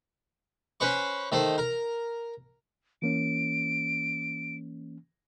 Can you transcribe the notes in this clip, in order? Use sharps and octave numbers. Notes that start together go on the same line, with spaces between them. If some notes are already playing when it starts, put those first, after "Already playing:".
C#4 B4 C5 C#6
D#3 A3 C5
A#4
E3 A#3 C#4 D7